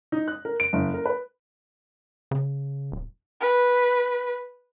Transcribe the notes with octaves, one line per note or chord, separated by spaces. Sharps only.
D#4
F#6
A#4
D7
F#1
A#4
B4
C#3
D1
B4